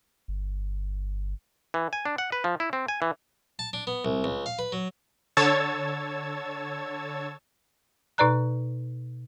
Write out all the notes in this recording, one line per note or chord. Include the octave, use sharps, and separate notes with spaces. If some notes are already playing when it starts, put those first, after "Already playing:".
G1
E3
G#5
D4
F#5
B4
F3
E4
C4
G#5
E3
A5
D4
B3
C2
C#2
F5
B4
F#3
D3 C#5 A5 E6 G#6 A6
B2 D#4 B4 D5 A#5 F#6